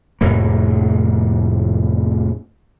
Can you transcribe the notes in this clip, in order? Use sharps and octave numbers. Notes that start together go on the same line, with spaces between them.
F1 F2 A2 A#3